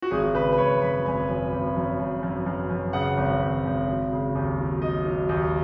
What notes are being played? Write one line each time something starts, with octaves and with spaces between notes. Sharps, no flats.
F#4
G#1 G#4
C#3 B4
B4
G#1 C#5
F#2 B5
G#1 G#5
F#2
G#1
F#2
F#2
F#2
F#2
F#2
C#3 F#5
G#1
G#1
G#1
F#3
C#3
D#2
F#3
F#3 D#5
F#3
D#2